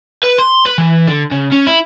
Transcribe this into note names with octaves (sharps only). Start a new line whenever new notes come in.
B4
C6
B4
E3
D3
C#3
C#4
E4